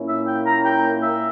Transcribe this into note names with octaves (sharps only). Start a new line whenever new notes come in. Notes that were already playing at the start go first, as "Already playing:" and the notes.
Already playing: A#2 A#3 C#4 E4
E5
G5
A#5
G5
E5